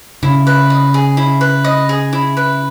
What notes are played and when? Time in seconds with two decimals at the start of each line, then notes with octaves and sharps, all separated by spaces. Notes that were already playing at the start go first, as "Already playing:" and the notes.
0.23 C#3 E4
0.47 B4
0.70 D#5
0.94 G#4
1.17 E4
1.41 B4
1.64 D#5
1.89 G#4
2.13 E4
2.37 B4